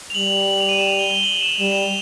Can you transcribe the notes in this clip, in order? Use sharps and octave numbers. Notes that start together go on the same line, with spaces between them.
F7
G3 F#7
F#7
F7
D#7
E7
F7
G7
G7
F#7
E7
G3 E7
F7
E7
F7